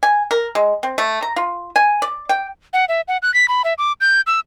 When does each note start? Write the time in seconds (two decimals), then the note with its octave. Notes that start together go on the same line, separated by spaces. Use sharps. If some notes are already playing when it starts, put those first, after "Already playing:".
0.03 G#5
0.31 A#4
0.55 G#3
0.83 C4
0.98 A3
1.22 A#5
1.36 F4
1.76 G#5
2.02 D5
2.29 G5
2.73 F#5
2.89 E5
3.08 F#5
3.22 F#6
3.34 B6
3.48 B5
3.64 E5
3.78 D6
4.01 G6
4.27 E6